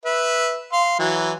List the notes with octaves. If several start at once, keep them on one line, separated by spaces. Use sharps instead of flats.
B4 E5
F5 C6
E3 F#3